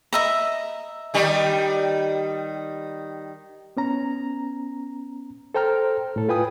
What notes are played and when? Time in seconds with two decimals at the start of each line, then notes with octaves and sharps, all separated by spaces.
0.13 D#5 E5 A#5
1.14 D#3 G3 D#4
3.77 B3 C#4 A#5
5.55 A4 C5 G5 A#5 F6
6.16 A2 A4
6.29 F4 B4 G5 G#5 D#6